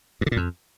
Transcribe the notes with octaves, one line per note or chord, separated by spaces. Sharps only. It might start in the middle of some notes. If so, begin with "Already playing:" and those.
G2
D3
A#2
F2